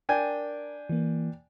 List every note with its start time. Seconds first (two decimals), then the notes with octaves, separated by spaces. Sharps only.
0.09 D4 A#4 G5 G#5
0.89 E3 A#3